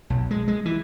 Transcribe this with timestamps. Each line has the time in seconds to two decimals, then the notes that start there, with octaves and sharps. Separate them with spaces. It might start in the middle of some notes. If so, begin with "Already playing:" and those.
0.10 B1
0.31 G#3
0.48 G#3
0.65 E3